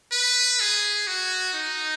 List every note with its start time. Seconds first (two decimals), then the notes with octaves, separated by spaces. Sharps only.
0.12 B4
0.60 G#4
1.07 F#4
1.53 D#4